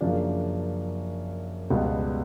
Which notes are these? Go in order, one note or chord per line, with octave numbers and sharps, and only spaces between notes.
F#2 C#3 F3 A#3 D4
C#2 B2 G3 B3